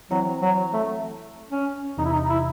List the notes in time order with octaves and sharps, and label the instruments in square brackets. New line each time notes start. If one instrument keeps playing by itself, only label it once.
[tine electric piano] E3 C4 E4 [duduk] F#3
[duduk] F#3
A3
C#4
[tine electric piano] E2 C3 E3 [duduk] D#4
[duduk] E4
D#4
E4